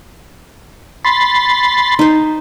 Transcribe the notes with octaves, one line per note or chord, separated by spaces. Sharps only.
B5 C6 A6
D#4 C5